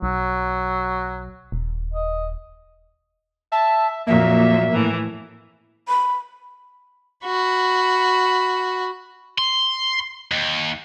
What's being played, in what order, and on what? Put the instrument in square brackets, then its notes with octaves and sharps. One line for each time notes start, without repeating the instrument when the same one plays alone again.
[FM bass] B1 [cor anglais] F#3
[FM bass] D#1
[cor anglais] D#5
[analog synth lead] E5 [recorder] A5
[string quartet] F2 A#2 F#3 [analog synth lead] A#3 [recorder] E5
[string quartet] A2 E3
[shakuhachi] B5
[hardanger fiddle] F#4 B5
[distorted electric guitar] C6
D#2